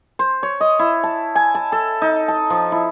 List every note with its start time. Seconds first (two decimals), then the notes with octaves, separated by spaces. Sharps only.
0.19 C5
0.43 C#5
0.61 D#5
0.79 E4
1.04 A5
1.35 G#5
1.55 A5
1.72 A4
2.02 D#4
2.28 A5
2.50 F3
2.72 E4